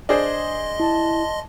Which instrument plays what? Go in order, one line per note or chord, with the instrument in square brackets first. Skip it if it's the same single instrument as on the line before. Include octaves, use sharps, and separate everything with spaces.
[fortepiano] D4 G#4 C5 [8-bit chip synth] D#5 C6
[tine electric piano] E4 [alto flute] A5